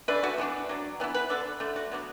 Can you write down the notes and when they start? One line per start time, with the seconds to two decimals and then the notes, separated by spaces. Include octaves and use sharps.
0.08 E3 A3 D4 B4
0.23 F#4
0.38 E3 B3 D4
0.69 F#3 D4
1.00 E3 B3 E4
1.14 B4
1.30 D3 B3 D4 A4
1.60 D3 A3 D4
1.76 F#4
1.91 F#3 B3 D4